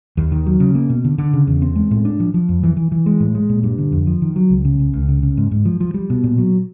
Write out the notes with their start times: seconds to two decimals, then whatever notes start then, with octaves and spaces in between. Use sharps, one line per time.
0.17 D#2
0.32 D#3
0.46 F#3
0.60 C#3
0.75 A#3
0.90 B2
1.04 D3
1.18 D3
1.33 C#3
1.47 E2
1.62 C4
1.75 G#3
1.91 A2
2.05 D4
2.20 F3
2.34 F3
2.49 F2
2.63 E3
2.77 E3
2.92 E3
3.06 G#3
3.20 A2
3.35 G#3
3.49 A#2
3.63 G2
3.78 D3
3.92 F2
4.07 F3
4.22 D#3
4.36 F#3
4.50 C#2
4.65 C#3
4.79 C#2
4.93 C#2
5.08 C#3
5.23 C#3
5.37 G#2
5.51 G#2
5.65 F3
5.80 F3
5.94 G3
6.10 B2
6.24 A#2
6.38 F#3